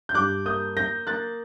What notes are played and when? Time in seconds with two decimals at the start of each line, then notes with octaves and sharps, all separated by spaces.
0.09 G6
0.14 G2 D6 F#6
0.46 A#3 D#6 G6
0.76 A#3 G6 A#6
1.07 A#3 F#6 A6